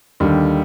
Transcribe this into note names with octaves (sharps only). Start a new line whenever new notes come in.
D#2 D3 G3